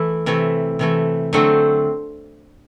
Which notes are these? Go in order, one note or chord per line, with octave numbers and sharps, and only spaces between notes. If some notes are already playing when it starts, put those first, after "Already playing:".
Already playing: E3 A3 E4
C3 E3 A3
C3 E3 A3
D3 F#3 A3 C4